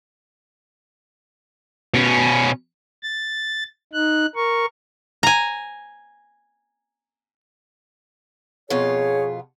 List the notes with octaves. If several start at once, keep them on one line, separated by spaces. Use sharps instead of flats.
B2 C#4
A6
D#4 F#6
A#4 C#6
G#5 A#5
F2 B2 F4 G#4 C#5